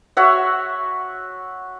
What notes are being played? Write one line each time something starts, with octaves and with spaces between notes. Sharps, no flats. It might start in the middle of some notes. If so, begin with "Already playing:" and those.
F#4 C#5 E5 F#5